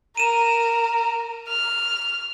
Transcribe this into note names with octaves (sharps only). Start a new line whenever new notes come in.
A#4 D#7 E7
F6